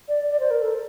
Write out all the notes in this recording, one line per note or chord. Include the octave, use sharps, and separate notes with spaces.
D5
D5
C5
A#4
A4